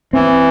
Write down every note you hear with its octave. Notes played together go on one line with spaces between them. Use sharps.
E3 C4